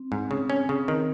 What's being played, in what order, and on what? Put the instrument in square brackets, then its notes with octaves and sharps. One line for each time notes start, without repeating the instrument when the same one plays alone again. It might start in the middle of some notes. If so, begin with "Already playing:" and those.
Already playing: [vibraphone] C4
[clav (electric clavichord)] G#2
[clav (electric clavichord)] C#3 [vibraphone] C4
[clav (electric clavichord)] C#4
C#3
[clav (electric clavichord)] D#3 [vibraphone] C4